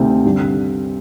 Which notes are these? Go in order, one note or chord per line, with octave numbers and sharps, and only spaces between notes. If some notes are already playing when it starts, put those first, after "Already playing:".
Already playing: D2 C3 D#3 C4
G2 D3